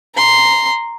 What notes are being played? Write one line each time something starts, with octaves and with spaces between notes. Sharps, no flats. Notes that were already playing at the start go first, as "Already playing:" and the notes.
A#5 C6